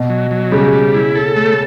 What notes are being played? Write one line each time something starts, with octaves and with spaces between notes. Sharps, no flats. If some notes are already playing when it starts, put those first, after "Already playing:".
Already playing: B2
F#3
F#3
C#3 G3
G3
E4
A4
A3